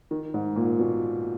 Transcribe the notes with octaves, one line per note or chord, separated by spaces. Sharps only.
D#3
G#2
A#2
B2